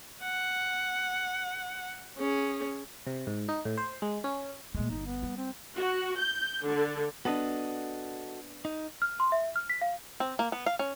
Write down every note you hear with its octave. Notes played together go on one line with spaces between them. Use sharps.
F#5
C#4 G#4
C3
G#2
D#4
A2
C5
G#3
C#4
A#2 G#3 A3
G1 D#4
B3
G3
C4
F#4
G6
D3
B3 D4 F#4 A4 D#5
D#4
F6
C6
E5
F6
B6
F5
C4
A#3
B3
F5
C#4